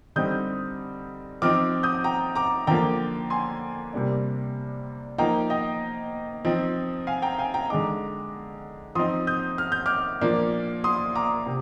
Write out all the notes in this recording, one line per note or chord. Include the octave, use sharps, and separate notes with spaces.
D3 G3 C4 D#4 D#6 G6
F3 C4 D#4 D6 F6
D#6 G6
G5 A#5
A#5 D6
D3 F3 A#3 G5 A#5
G#5 C6
C3 G3 A#3 D4
F3 A#3 D#4 G5 A#5
D#5 G5
F3 C4 D#4
F5 G#5
G5 A#5
F5 G#5
G5 A#5
D3 G#3 D#4 A#5 D6
F3 C4 D#4 C6 D#6
D#6 G6
F6
G6
D6 F6
A#2 F3 A#3 D4
C6 D#6
A#5 D6
C3